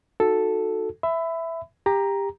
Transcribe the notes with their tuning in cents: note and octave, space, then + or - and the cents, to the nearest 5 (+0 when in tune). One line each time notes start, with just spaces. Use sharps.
D#4 +0 F#4 +0 A4 +0
E5 +0 B5 +25
G4 +20 A#5 +5